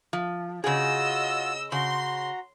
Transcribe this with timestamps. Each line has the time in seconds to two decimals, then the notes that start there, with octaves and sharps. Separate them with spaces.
0.13 F3
0.64 C#3 F4 F#4 G#4 D#5 E6
1.72 C#3 F#4 A#5 C6